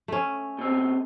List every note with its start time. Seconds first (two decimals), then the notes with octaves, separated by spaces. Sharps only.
0.08 A3 C#4
0.58 B2 C4